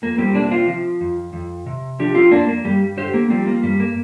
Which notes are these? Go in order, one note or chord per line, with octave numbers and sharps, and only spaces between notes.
F2 A#3
G3 C4
C3 A#3 D4
C4 F4
F3
F2
F2
C3
F3 D4 G4
C4 F4
F2 A#3 D4
A#3
G2 G3
D3 G4 C5
A#3
F3 G3 C4
A#3
G2 G3
A#3